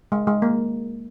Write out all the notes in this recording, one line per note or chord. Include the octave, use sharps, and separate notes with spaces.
G#3
G#3
A#3